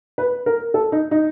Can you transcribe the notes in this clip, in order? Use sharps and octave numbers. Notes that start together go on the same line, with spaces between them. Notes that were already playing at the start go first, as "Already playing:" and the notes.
B4
A#4
A4
D#4
D#4